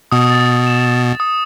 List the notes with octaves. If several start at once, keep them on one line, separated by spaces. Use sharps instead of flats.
B2 D#6
A6
D#6
E7
D#6
A6
D#6